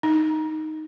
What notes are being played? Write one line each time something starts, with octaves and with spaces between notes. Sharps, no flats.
D#4